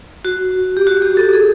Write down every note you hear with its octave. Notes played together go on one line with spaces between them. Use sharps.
F#4
G4
F#4
G4
A4
G#4